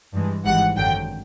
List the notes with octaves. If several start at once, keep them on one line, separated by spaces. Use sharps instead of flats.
G2 E3 G#3
G#1 G#2 E3 G3 F#5
G#1 F#2 D3 F#3 G5